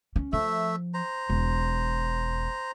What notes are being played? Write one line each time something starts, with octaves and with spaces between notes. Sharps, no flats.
C#4
F3 A3 E5
C5 A#5
E1